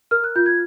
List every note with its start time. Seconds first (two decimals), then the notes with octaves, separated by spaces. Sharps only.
0.11 A#4 F6
0.24 F#6
0.36 F4 G6
0.46 G#6